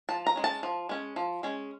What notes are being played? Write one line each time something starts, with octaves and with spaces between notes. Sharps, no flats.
F3 A5
A#5
G#3 C#4
A5
F3
G#3 C#4
F3
G#3 C#4